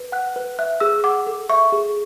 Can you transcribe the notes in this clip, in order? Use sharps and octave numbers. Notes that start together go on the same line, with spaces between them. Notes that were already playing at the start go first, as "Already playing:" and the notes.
Already playing: B4
F#5 F#6
B4
E5 F#6
G#4 E6
F#5 D6
A4
E5 C#6
G#4